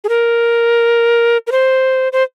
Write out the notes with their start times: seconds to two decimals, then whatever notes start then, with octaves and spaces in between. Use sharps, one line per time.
0.04 G#4
0.09 A#4
1.47 A#4
1.52 C5
2.13 C5